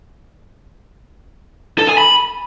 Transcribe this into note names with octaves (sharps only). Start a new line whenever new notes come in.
A4
G#5
B5